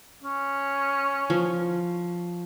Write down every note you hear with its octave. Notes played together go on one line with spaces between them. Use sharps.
C#4
F3